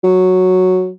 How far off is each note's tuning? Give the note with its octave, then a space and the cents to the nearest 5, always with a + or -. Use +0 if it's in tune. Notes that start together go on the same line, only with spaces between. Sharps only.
F#3 -5